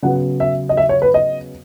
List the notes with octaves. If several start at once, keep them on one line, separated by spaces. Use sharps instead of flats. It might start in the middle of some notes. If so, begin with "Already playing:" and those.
C#3 F#3 B3 F#5
E5
D#5
E5
C#5
B4
D#5